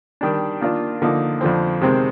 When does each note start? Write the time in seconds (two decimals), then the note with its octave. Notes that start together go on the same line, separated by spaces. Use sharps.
0.21 D#3 G3 D4
0.61 D#3 A#3 D4 F4
1.02 D3 F3 A#3 D#4
1.41 F2 D3 F3 C4
1.81 C3 D#3 G#3 C4